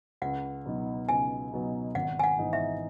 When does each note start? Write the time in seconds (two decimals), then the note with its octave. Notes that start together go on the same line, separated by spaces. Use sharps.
0.22 C#2 F#5
0.66 B2 F#3 B3 D#4
1.09 C#2 G#5
1.53 B2 F#3 B3 D#4
1.95 G#1 F#5
2.19 G#5
2.23 F#5
2.38 G#2 E3 B3 D#4
2.53 E5